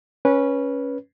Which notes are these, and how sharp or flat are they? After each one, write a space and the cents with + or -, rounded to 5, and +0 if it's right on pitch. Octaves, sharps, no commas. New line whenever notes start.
C#4 +0 B4 -20